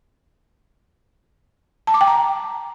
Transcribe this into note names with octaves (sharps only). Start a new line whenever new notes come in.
A5
D6
G5
A#5